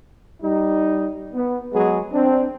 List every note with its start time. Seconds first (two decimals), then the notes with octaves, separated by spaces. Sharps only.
0.42 G3 D#4
1.34 B3
1.73 F#3 G#3 B3 G#4
2.12 C4 D4